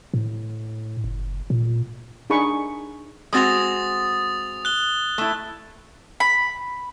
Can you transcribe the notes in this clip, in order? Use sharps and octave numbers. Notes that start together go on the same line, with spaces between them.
A2
F#1
A#2
D4 D#4 G#4 B5 C#6
G#3 C4 F#4 D#6 A6 F7
F#6 G7
A3 E4
B5